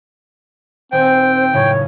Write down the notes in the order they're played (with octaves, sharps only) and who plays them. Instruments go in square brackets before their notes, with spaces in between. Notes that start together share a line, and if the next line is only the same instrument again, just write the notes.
[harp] D#1 G#5 [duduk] C4 [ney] C5 [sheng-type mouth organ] G5
[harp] F#2 A2 C#3 [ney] C#5